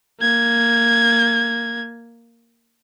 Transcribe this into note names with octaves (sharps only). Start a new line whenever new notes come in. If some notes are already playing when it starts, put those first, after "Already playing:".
A#3 G#6